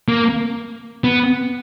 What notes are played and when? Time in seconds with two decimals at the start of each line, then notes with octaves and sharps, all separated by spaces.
0.08 A#3
1.04 B3